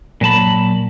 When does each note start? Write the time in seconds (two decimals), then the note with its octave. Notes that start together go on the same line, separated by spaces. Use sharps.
0.21 A#2 F#3 A5 B5